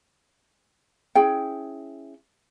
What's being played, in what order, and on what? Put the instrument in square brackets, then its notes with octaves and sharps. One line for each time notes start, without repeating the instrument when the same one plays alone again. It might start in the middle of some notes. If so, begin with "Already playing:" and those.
[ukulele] C#4 E4 G#4 G5